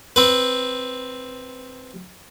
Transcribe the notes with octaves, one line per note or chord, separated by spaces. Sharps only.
C4 B4